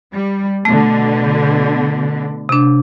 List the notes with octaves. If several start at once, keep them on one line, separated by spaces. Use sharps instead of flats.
G3
B2 D3 A3
C3 D4